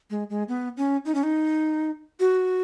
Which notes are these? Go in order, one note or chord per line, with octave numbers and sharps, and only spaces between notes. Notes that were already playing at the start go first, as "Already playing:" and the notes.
G#3
G#3
B3
C#4
D#4
C#4
D#4
F#4